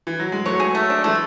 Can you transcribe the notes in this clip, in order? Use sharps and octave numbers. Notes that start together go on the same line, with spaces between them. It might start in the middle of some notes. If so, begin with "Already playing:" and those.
E3
F#3
G#3
F#3 A3 C#5
G#4
A3
D4
E3 G#3 A3